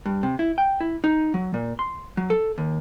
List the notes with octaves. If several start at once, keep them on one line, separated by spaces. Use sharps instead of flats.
G2
C3
E4
G5
E4
D#4
F#3
A#2
C6
F#3
A4
D#2